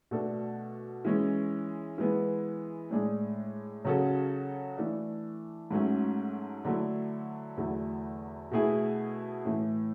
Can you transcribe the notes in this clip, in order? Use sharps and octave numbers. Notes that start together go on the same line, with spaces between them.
B2 A3 D4 A4
E3 G#3 C#4
E3 G#3 B3
A2 G#3 D4 G#4
C#3 F#3 C#4 F#4 A4
E3 A3 D4
G#2 F#3 A3 C#4
D3 F#3 A3 E4
E2 D3 F#3 A3 E4
B2 A3 E4 G#4
A2 E3 A3